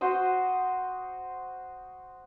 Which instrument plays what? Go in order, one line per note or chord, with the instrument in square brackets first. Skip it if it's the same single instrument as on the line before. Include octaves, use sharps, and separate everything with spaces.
[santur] F#4 C5 D#5